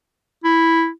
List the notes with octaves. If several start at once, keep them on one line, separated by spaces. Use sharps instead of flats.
E4